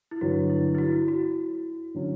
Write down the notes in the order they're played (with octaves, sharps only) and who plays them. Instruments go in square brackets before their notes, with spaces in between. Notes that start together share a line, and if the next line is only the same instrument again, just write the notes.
[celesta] E4
[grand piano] G2 D3 F#3 [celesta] F#4
[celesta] E4
E4
F#4
F#4
[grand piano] D3 F#3 C#4